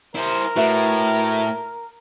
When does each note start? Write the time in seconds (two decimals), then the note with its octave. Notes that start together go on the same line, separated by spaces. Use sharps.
0.15 E4 A#4 C5
0.56 A2 F#4 B4 E5